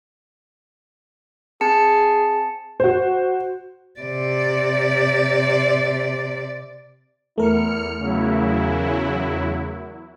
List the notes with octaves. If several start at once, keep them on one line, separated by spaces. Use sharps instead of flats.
C4 G#4 A5 C#7
F#4 C5
C3 D5
E2 A3 E4 A#4 F6 C#7
E2 C#3 F#3 E4